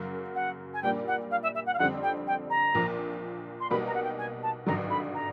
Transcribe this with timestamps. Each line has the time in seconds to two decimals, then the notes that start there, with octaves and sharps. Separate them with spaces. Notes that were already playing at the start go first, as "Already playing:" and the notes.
Already playing: F#2 C#3 F#3 A#3
0.35 F#5
0.74 G#5
0.82 A#2 G3 A#3 D4 G5
1.07 F#5
1.31 F5
1.43 E5
1.55 E5
1.66 F#5
1.74 F5
1.79 F2 D3 G3 C4 F#5
2.03 G5
2.27 G5
2.50 A#5
2.75 A#1 A#2 F3 A#3
3.60 C6
3.70 B1 B2 G3 A#3 B5
3.87 A#5
3.94 F#5
4.03 G5
4.18 G#5
4.43 A5
4.66 G#1 G2 D3 F#3 A#5
4.90 B5
5.14 A#5